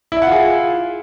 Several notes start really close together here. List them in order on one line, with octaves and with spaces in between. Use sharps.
E4 E5 F#5 F4 G#4